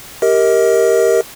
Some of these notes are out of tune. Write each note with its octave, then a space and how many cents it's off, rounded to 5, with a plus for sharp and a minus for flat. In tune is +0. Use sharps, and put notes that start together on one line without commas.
G4 +0 A#4 +0 D#5 +35